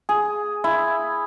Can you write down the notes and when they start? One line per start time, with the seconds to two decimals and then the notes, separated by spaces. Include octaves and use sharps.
0.09 G#4
0.64 E4